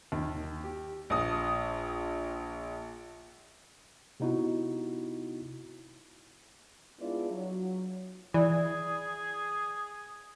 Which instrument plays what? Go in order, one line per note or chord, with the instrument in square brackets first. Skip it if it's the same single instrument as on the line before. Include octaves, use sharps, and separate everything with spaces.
[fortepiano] D#2
G4
[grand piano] A#1 D#6
[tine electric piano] C3 B3 D#4 E4 F#4
[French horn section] G#3 B3 D4 E4 F4 D5
F#3
[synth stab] E3 [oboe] G#4 [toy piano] D5